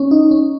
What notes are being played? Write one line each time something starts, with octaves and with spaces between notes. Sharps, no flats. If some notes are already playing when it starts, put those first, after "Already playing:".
Already playing: C#4
D#4
C#4